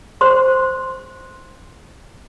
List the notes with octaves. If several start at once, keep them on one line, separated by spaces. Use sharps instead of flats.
C5 C6